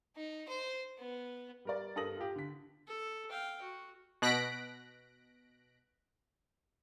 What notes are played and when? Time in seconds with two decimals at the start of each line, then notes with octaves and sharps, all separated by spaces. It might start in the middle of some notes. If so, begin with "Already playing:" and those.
0.16 D#4
0.48 C5
0.98 B3
1.65 G3 A#4 D5
1.96 G2 A4 A#4 D#6 A#6 F#7
2.17 F4 G4
2.36 D3 B6
2.87 A4
3.29 F5 G5
3.62 F#4
4.22 B2 F#6 A#6 B6 D7